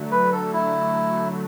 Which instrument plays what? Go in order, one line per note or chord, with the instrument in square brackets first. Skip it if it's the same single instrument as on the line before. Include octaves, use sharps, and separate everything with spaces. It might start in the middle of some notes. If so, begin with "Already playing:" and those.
Already playing: [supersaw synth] D3 F#3 A3
[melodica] B4
A4
E4